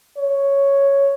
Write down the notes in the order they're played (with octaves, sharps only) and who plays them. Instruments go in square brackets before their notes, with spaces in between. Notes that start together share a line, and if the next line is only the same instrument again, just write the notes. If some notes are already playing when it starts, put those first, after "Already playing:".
[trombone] C#5